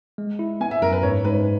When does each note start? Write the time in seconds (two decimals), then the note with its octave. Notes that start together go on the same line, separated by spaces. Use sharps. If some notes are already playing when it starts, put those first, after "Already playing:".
0.18 G#3
0.39 E4
0.61 B3 G#5
0.71 E5
0.82 F#2 A#4
0.92 B4
1.03 G#2 C#5
1.24 G#2 B4